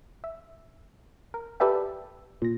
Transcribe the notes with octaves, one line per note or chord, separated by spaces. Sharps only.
E5
A#4
G4 A4 B4 D5 E5 G5
A#2 A#6